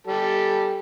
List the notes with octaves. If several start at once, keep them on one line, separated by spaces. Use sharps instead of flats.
G3 G4 A4